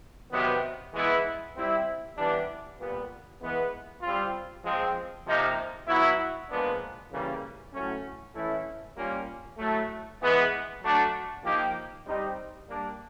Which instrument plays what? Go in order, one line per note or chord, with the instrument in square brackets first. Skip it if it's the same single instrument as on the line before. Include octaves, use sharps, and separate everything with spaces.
[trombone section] C3 D#3 F#3 B3
E3 G#3 B3 E4
G3 C4 E4
E3 G3 B3 D4
A#2 G3 B3
E3 G#3 B3
G3 C4 F4
F3 G#3 C4
C3 F3 A#3 D#4
F#3 B3 E4
A#2 F3 G#3 B3 D4
C#3 E3 G3 A#3 C#4
A2 F#3 A3 C#4
E3 A3 C#4 E4
G3 A#3 C#4 F4
A2 F#3 A3
E3 G#3 B3
F#3 A3 D4
F3 A#3 D#4 G4
G3 C4 D#4 G4
G3 A#3 D4